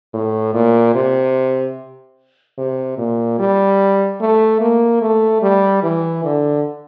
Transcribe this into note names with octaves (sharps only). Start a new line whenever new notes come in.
A2
A#2
C3
C3
A#2
G3
A3
A#3
A3
G3
E3
D3